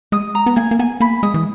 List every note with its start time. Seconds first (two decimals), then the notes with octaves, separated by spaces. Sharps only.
0.12 G#3 D#6
0.35 A#5
0.46 B3
0.56 A#3 G#5
0.71 A#3
0.79 B3 G#5
1.00 A#3 B5
1.23 G#3 D#6
1.34 E3